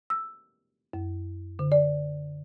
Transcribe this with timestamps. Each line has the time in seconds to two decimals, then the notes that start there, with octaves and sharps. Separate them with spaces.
0.10 E6
0.93 F#2
1.59 D3
1.72 D5